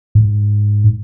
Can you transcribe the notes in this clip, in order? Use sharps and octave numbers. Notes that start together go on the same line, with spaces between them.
G#2